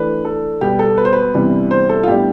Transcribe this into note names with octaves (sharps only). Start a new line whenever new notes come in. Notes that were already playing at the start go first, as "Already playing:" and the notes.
Already playing: E3 A3 D4 B4
A4
B2 G3 B3 G4
A4
B4
C5
B4
C3 E3 G3 B3 D4
C5
A4
F4
A2 G3 B3 D4 G4